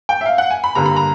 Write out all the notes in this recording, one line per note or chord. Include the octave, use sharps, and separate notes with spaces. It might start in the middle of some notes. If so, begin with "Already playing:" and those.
G5
E5
F5
F#5
G#5
B5
G2 D3 G3 A#3 A#5
B5
A#5